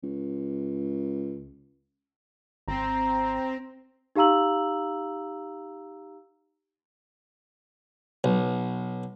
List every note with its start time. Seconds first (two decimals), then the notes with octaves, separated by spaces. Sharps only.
0.03 C#2
2.68 G#1 C4 A#5
4.16 D#4 G4 F5 A#5 E6 F#7
8.24 B1